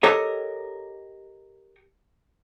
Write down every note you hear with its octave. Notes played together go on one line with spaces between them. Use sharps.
G4 A4 A#4 C#5 D#5